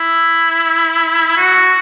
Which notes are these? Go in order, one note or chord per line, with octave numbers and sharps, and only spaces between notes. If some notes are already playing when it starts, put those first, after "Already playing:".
Already playing: E4
F#4